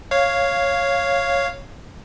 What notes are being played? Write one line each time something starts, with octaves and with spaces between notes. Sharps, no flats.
C#5 F5